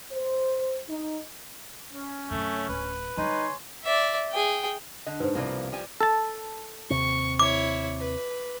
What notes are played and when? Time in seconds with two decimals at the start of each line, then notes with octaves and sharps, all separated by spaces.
0.12 C5
0.87 D#4
1.93 C#4
2.30 F#2 C3 A3
2.69 D1 B4
3.18 D3 G3 D#4 C#5 G#5 C6
3.84 D5 E5
4.32 G#4 G5
5.07 D3 D#5
5.20 G#2 B4 C5
5.35 C2 B2 F3 A#3 D5
5.72 F3 G3 G#5
6.01 A4 A5
6.90 D#2 C3 C4 C#6
7.39 E4 C#5 D6
8.00 B4